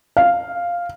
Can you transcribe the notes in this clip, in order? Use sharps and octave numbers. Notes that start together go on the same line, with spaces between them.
F5